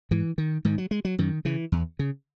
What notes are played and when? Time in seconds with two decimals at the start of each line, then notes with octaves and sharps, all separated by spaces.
0.11 G#2 E3
0.38 D#3
0.65 G#2 D#3
0.78 F#3
0.91 G#3
1.05 F#3
1.19 F#2 D#3
1.45 C#3 E3
1.72 E2
1.99 C#3